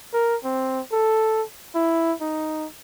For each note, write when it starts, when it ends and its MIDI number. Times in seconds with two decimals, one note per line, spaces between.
0.13 0.36 70
0.44 0.81 60
0.92 1.43 69
1.75 2.13 64
2.21 2.66 63